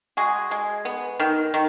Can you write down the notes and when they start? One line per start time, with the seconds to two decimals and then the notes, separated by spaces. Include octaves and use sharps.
0.17 G#3 F#4 G#4
0.51 G#3
0.85 B3
1.20 D#3
1.54 D#3